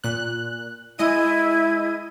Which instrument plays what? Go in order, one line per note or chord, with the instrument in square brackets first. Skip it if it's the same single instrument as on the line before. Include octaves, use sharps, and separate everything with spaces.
[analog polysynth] A#2 F#6
[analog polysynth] G#3 D#5 D#7 [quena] E4